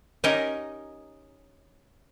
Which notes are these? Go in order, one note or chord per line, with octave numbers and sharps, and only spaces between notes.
C#4 D#4 G4 A#4 D#5